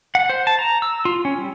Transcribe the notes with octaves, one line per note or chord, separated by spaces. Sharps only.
F#5
C5
A5
A#5
E6
F4
C#4
G3